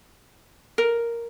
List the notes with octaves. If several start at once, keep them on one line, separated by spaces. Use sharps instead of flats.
A#4